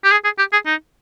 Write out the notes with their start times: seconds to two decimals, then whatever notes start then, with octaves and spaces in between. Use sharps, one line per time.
0.04 G4
0.12 G#4
0.25 G#4
0.38 G4
0.53 G#4
0.66 D#4